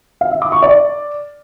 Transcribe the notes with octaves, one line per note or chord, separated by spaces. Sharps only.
F5
E5
D6
C#6
D5